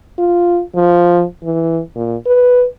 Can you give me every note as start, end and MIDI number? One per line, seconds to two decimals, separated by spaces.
0.18 0.61 65
0.75 1.24 53
1.43 1.81 52
1.95 2.16 46
2.26 2.65 71